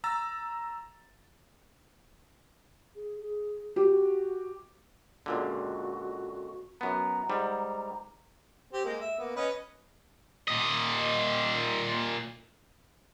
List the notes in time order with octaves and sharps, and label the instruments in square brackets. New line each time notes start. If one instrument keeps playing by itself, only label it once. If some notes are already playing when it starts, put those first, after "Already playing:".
[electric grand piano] A#5 E6 A6
[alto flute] G#4
G#4
[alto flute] F#4 [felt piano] G4
[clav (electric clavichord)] C#2 A#2 D3 [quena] F#4
[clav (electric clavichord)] F#2 B3 [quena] A#5
[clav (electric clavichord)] G#2 G3
[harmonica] C4 G4
G#3 A#3
E5
A#3 B3
C#4 B4 D#5
[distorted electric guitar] A#2 D#5